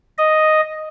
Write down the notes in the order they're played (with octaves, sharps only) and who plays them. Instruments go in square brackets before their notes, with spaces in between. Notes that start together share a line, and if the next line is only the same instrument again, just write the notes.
[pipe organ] D#5